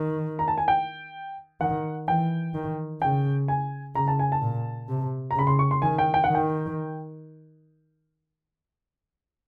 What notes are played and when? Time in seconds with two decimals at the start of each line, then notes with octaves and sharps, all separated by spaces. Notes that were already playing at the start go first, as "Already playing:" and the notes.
Already playing: D#3
0.39 A#5
0.48 A5
0.58 G#5
0.68 G5
1.61 D#3 F#5
2.08 E3 G5
2.54 D#3
3.02 C#3 G5
3.48 G#5
3.95 C#3 A#5
4.08 A5
4.19 G#5
4.32 A5
4.42 A#2
4.89 C3
5.31 A#5
5.36 C#3 B5
5.47 C6
5.59 C#6
5.71 C6
5.82 D#3 G#5
5.98 G5
6.14 G5
6.24 F#5
6.29 D#3
6.35 G5